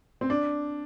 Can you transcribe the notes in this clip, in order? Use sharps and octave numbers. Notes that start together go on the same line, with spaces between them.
C4
D4